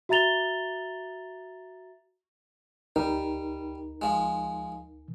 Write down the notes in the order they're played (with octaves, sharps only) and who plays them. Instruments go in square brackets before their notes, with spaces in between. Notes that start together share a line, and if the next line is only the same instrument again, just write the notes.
[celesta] F#4 E5 A#5 A6 F7 G7
[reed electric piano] D2 D#4 A#4 [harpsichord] G3
[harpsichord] F3 G#3